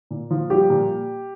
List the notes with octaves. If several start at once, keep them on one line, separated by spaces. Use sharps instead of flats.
A#2
F3
G3 G4
A#2